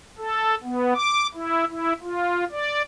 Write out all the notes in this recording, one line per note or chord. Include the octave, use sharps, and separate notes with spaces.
A4
B3
D6
E4
E4
F4
D5